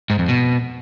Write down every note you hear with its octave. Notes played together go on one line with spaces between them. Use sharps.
G#2
F2
B2